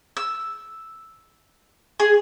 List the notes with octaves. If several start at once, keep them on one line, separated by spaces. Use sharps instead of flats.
E6
G#4